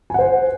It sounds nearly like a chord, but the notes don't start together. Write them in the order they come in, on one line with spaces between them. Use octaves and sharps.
G#5 F#5 C5